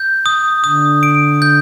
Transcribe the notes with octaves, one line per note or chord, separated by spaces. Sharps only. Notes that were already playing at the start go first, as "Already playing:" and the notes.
Already playing: G6
D#6
D3 D#6
D7
G6